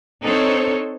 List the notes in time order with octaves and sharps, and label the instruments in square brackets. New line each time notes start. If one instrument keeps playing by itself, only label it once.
[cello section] C4 D4 D#4 A4 C5 C#5